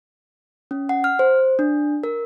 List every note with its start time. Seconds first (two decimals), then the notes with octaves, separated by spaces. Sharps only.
0.71 C#4
0.89 F#5
1.04 F6
1.19 C5
1.59 D4
2.03 A#4